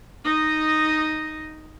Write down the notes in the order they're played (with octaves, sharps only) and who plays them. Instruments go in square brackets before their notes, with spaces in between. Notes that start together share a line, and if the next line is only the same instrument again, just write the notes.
[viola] D#4 D#5